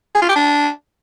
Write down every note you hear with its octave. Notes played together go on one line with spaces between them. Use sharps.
G#4
F4
G4
D4